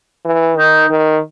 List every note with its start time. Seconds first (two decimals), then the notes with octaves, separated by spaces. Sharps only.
0.25 E3
0.57 D#3 D#4
0.90 D#3